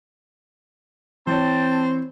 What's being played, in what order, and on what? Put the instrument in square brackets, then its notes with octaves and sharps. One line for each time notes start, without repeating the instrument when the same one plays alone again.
[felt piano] E3 C#5 [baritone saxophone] C4 [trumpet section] G5 A5